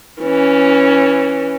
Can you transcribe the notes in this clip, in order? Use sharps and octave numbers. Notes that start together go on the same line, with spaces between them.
E3 C#4